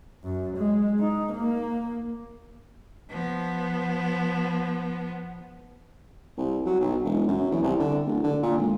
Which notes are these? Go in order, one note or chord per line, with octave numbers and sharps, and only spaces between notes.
F#2
G#3
D#4
A#3
F3 B3
C2
F#3
B1
E1
F#2
E2
C2
D3
D1
D3
A#2
G#1